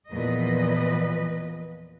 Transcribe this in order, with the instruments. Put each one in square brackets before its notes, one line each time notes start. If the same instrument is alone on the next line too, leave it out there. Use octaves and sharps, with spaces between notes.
[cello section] E2 A#2 F3 B4 D#5